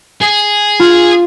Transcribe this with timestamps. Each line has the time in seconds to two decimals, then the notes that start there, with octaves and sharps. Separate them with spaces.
0.22 G#4
0.80 F4